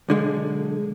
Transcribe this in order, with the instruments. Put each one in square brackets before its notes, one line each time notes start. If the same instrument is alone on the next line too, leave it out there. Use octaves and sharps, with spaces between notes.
[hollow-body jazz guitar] B1 D3 G#3